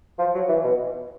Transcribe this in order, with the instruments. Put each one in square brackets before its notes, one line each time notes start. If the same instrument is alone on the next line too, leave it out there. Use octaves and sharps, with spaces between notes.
[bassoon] F3
F#3
E3
B2